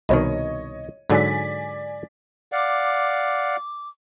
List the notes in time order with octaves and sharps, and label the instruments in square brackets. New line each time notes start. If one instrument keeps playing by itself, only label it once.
[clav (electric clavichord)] C2 B2 D#3 [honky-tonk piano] C#5 D#5
[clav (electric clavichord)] G#2 D3 F#3 [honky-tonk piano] D5 G#5 B6
[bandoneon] D5 F5 F#5 [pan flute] D6